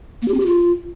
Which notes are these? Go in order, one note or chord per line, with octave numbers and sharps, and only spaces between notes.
A#3
G4
C4
G4
F4